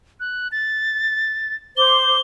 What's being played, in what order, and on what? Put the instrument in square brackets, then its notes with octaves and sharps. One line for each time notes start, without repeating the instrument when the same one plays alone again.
[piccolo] F#6
A6
[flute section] C5 D6 [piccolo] G7